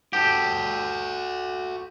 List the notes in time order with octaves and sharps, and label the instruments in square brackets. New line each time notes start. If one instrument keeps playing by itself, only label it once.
[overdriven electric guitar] F#4 A4 [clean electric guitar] G4